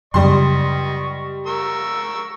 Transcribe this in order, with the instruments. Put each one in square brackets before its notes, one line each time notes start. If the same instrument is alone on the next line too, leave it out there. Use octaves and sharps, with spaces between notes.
[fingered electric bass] F#2 C#3 [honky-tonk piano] G3 C6 [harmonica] D#5 C#6
[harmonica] A#4 C#6 E6